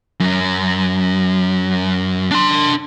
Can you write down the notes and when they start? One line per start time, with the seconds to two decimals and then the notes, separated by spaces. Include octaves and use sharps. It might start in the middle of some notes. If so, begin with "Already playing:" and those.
0.20 F#2
2.31 D4 C6